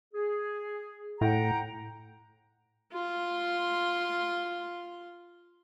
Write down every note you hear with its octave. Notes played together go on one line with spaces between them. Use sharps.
G#4
A2 F#5 G5 A#5
F4 C6